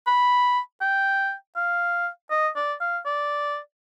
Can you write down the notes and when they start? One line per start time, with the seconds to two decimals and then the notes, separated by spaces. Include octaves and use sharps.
0.07 B5
0.81 G5
1.56 F5
2.31 D#5
2.56 D5
2.81 F5
3.06 D5